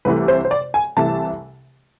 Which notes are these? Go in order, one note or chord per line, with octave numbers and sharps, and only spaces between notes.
C2 C3 E3 A3 B4
C5
C5
D5
G#5
C2 C3 E3 A3 A5